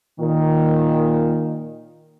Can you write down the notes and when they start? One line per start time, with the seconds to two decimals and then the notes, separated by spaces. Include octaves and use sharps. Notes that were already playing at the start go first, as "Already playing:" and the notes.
0.20 A#2 D#3